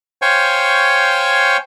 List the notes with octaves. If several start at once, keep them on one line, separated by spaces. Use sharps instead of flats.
C5 C#5 F5 G5 G#5 C#6